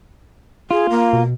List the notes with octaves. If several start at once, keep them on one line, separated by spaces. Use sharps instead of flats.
F4 G#4
A#3
B2